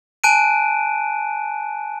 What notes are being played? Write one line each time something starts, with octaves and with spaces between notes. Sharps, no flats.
G#5 A5 F#6 D7 D#7